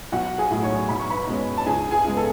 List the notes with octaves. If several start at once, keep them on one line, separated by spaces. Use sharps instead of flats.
B1 F#4 F#5
G#4 G#5
A2 F#3 A3
C#5 C#6
B1 B5
C#6
B4 B5
B2 G#3 C#4
A5
C#2 G#4 G#5
G#4 G#5
C#3 G#3 B3
A4